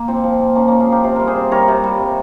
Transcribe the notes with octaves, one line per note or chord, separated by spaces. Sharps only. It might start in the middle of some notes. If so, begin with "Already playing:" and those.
Already playing: A#3
A#2 C4
F3
A#2
F3 A#3 C#4
A#2 A#3 C#4
F4 G#4
F3 G4 A#4
C3 C5
G3 A#4
G#4 C5
C3
G3 A#4 C#5
C3
G3
C3